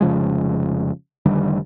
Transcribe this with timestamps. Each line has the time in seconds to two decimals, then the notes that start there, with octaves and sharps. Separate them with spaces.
0.01 F1 C#3 F3 G#3
1.26 F1 D3 D#3 G3